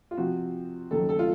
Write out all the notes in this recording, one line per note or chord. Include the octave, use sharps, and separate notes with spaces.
F4
C3 F3 C4 F#4
D#2 C#3 F#3 A4
A4
F4